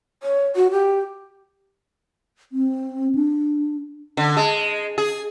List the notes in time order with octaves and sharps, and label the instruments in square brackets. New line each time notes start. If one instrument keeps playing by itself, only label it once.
[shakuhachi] C#5
F#4
G4
[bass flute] C4
D4
[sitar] D3
G#3
G#4